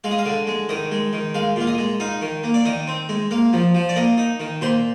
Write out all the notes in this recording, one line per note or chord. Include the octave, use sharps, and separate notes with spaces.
G#3 F5
D#5
F5
D3
G#3
D#3 D#5
G#3
D#3
G#3 F5
A#2 F5
D#5
G#3
D#4 F5
D#3
A#3
D5
D#3 D#5
C4
G#3
A#3 F5
F3
F3
D5
A#3 D#5
D#4
D#3
A#2 C5